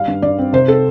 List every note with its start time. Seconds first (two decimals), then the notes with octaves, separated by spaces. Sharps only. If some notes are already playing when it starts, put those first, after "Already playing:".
Already playing: G3 F5
0.08 G2
0.22 G2 D5
0.38 C4
0.53 C3 C5
0.68 C4 A4